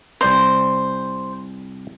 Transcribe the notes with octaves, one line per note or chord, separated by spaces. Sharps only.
C2 C5 D5 A#5